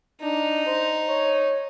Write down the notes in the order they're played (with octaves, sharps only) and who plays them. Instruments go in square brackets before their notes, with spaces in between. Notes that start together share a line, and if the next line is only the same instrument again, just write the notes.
[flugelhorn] D4 [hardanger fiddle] D#4
[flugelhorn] C5
C#5